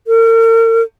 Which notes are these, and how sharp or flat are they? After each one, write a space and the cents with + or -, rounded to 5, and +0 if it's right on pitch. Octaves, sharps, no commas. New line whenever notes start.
A#4 -40